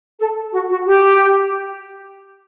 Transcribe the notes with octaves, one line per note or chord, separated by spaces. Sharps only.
A4
F#4
F#4
G4